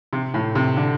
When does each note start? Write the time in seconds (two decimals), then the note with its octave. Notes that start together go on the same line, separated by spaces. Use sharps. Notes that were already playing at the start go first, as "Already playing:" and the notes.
0.13 C3
0.34 A2
0.55 C3
0.77 D3